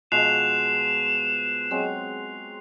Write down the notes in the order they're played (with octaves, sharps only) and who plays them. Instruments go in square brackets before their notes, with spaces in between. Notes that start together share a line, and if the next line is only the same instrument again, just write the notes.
[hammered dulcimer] B2 F3 G#3 [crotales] F#6 C7 F7 [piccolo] E7
[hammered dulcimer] F#3 G#3 C4